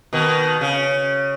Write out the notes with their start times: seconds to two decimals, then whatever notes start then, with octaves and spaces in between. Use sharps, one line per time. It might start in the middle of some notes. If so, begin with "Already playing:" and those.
0.13 B2 D#3
0.61 C#3